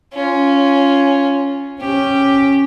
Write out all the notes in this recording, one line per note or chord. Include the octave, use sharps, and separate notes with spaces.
C#4 F4
C#4 G4